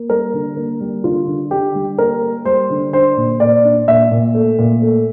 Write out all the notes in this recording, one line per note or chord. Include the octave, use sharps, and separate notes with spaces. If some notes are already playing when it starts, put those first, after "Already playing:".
Already playing: A#3
G3 A#4
D3
A#3
G3
D3 F4
D3
D3 G4
G3
A#3 A#4
A#3
G3 C5
D3
D4 C5
A#2
A#2 D5
D4
A#2 E5
A#2
A3
A#2
A3